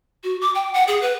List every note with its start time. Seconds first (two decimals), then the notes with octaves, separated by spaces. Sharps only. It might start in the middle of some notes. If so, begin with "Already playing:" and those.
0.23 F#4
0.41 D6
0.55 G5
0.74 F#5
0.88 G#4
1.02 B4